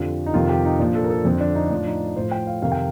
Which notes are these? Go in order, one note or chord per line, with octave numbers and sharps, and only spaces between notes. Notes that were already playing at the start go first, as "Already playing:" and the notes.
Already playing: F2 D3 F3 G4
D#4
F2 C3 D#3 F4
G4
D#4
A#2 F3 D4
A4
A#4
A4
F2 D3 F3 C4
D4
D#4
A2 F3 D4
D#4
A2 F3 C5
G5
F5
F2 C3 D#3 F5
G5